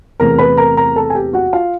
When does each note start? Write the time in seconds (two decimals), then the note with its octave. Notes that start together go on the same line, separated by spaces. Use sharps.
0.20 E2 C3 E3 A3 A#4 A#5
0.38 B4 B5
0.57 A#4 A#5
0.77 A#4 A#5
0.96 A4 A5
1.10 G#5
1.15 G4 G5
1.33 F#4 F#5
1.53 F4 F5